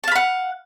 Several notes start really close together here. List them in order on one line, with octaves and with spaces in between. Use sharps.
A5 F5 B5 F#5